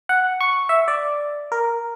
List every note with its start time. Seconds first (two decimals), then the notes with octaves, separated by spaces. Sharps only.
0.09 F#5
0.41 C#6
0.69 E5
0.88 D5
1.52 A#4